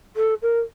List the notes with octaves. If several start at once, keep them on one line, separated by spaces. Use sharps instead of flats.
A4
A#4